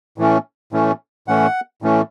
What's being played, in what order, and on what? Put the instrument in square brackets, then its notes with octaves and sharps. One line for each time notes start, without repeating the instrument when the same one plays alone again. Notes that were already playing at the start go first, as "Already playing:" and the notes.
[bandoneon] A2 E3 A3 C#4
A2 E3 A3 C#4
A2 E3 A3 C#4 F#5
A2 E3 A3 C#4